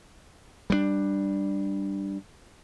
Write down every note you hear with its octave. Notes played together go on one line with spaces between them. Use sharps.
G3 G#3 D4